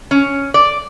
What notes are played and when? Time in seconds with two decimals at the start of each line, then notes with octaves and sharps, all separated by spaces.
0.11 C#4
0.54 D5